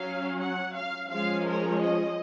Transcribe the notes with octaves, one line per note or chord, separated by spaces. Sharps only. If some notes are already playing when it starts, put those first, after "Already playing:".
Already playing: F#3 C#4 F5
F#5
F5
F3 G#3 C#4 F5
A#4
D#5